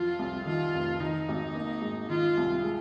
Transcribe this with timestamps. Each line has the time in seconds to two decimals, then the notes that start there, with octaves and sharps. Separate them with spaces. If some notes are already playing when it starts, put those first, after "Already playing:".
Already playing: F2 F3 F4
0.19 C2
0.46 D#3 F4
0.74 F1
1.00 D#3 D#4
1.28 G#1
1.55 A#3
1.82 G#2
2.10 D#3 F4
2.37 C2
2.64 G#3